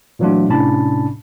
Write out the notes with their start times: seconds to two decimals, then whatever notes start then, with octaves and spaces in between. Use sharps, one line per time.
0.19 A#2 E3 F#3 A3 D4 F4
0.49 A2 C3 C#4 D4 A5 B5